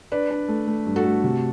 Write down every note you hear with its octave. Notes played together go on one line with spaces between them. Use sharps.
D4 B4 D5
D4
A3
A3
G2
F#4 A4
A3
C3